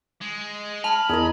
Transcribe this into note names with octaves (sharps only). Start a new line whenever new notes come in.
G#3
A5 B5 F6
E2 G#4 A#4 D#5